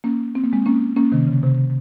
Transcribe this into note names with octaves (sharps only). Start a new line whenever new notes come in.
A#3 C#4
C4
A#3
G#3 C4
A#3 C#4
A#3 C#4
C3 D#3
C#3
C3